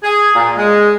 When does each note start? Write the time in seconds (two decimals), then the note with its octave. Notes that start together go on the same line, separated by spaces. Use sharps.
0.03 G#4
0.34 A#2
0.58 G#3